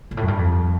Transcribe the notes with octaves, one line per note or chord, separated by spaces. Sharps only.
G#2
A2
F#2
G2
F2